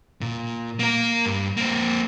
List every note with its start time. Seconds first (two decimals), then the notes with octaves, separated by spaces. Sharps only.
0.21 A#2
0.79 A#3 A#4
1.26 G2
1.57 A#3 C4